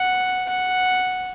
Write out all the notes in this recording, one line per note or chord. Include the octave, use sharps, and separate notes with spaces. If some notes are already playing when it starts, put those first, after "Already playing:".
Already playing: F#5
F#5